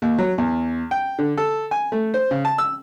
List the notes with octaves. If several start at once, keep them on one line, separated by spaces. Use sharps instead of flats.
D#2
F#3
E2
G5
D3
A4
G#5
A3
C5
C#3
A5
E6